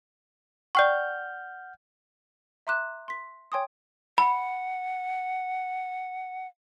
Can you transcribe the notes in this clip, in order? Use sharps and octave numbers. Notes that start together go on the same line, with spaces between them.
D5 F#5 G5 C#6 F6 G6
E5 A#5 C6 D6 F#6 E7
C6 B6
C#5 G5 G#5 C6 D6 D#6
F#5 B5